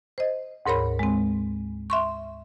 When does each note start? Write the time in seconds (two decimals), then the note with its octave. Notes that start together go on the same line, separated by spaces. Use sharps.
0.18 C5 D#5
0.66 D2 G#2 A#4 C#5 B5
0.99 G#3 C4
1.90 E5 C6 C#6